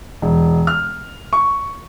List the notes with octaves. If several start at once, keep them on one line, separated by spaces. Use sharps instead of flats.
E1
F6
C#6